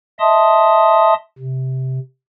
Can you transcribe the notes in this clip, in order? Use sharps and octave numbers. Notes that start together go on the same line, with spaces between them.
D#5 E5 A5 C6 D#6
C3